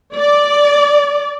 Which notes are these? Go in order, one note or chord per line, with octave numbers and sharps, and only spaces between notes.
D5